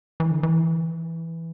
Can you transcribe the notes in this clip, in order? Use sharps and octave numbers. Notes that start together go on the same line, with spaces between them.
E3
D3
E3